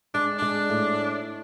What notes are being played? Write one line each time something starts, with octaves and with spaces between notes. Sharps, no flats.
G#3 D4
G#3 D4
A2